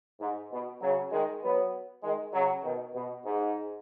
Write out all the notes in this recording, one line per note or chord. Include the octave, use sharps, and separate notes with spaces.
G#2
B2
C#3 F#3
D#3 G#3
F#3 B3
D#3 G#3
C#3 F#3
B2 D#3
B2
G#2